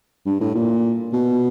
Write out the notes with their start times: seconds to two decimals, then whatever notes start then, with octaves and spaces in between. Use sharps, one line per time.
0.26 G2
0.41 A2
0.55 A#2
1.13 B2